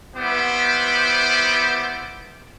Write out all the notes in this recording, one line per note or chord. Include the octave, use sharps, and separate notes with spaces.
G3 B3 E4 C5 D6